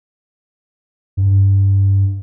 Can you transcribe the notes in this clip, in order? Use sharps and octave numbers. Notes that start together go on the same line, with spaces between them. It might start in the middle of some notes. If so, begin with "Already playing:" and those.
G2